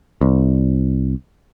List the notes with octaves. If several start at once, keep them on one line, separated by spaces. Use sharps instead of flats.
C2